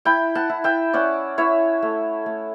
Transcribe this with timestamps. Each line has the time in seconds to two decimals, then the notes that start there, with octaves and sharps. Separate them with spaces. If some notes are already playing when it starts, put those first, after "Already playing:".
0.05 E4 G5 B5
0.35 F#5 A5
0.49 E4
0.64 E5 G5
0.93 C#4 D5 F#5
1.38 E4 C#5 E5
1.82 A3
2.26 A3